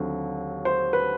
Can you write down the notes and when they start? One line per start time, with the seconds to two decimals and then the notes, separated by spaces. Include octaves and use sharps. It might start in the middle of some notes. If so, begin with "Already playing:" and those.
Already playing: D#2 D3 F#3 A3 C4
0.65 C5
0.93 B4